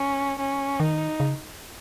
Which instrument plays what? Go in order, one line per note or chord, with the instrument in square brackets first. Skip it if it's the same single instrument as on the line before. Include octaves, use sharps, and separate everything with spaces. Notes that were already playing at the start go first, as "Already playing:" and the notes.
Already playing: [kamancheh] C#4
C#4
[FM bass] D#3 [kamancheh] D#4
[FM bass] C#3